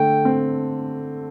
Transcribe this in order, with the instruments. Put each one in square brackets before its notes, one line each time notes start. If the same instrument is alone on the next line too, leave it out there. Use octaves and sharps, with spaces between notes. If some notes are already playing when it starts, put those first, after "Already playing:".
Already playing: [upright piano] D3 A3 [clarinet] G5
[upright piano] C4